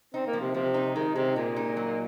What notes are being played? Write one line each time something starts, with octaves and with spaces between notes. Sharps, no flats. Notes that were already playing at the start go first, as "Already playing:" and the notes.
C4 D#4
A#3
F3
C3
C3 F3
D#4
D#3 G#3
C3 G#3
A#2 G#3
D#4
F#3